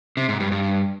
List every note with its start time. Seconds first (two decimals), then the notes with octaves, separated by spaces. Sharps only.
0.17 C3
0.29 G#2
0.40 G2
0.52 G2